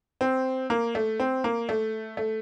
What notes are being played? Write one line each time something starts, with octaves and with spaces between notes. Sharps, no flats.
C4
A#3
A3
C4
A#3
A3
A3